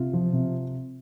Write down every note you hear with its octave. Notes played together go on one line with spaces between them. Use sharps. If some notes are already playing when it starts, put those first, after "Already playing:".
Already playing: C3 F4
F3
C3